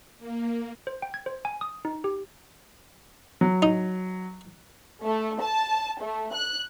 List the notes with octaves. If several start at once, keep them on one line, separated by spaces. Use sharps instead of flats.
A#3
C5
G5
G#6
C5
G#5
D#6
D#4
G4
F#3
D#4
A3
A5
A3
F#6